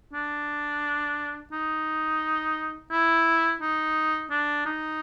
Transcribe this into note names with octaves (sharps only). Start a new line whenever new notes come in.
D4
D#4
E4
D#4
D4
D#4